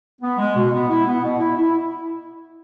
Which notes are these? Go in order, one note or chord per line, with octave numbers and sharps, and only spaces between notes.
B3
G#3
B2
B3
E4
B3
B2
E4
E4